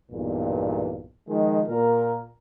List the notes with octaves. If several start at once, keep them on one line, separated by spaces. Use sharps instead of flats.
B1 E2 G2 A#2
D#3 F3 G#3
A#2 A#4